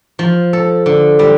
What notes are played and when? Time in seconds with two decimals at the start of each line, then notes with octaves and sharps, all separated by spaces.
0.19 F3
0.53 A4
0.86 D3
1.19 G3